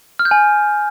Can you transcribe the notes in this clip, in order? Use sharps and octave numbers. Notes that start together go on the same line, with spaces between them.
F6
G6
G#5